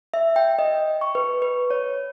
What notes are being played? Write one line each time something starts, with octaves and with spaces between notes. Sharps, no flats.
E5
G5
D#5
C#6
B4
B4
C#5